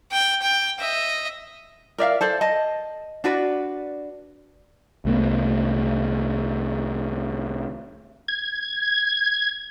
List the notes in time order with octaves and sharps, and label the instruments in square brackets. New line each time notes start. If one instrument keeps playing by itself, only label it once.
[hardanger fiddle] G5
G5
D#5 E5
[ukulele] A#4 D5 E5 F5
A4 C5 D5
D#5 A5
D4 F#4 B4 D5
[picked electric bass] C2 A3 B3
[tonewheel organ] G#6